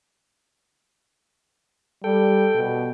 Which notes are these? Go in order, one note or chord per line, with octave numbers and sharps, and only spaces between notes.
G3 A4 G5
B2